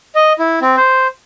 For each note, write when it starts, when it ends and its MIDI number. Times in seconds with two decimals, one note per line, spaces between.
0.15 0.33 75
0.39 0.60 64
0.62 0.76 60
0.77 1.07 72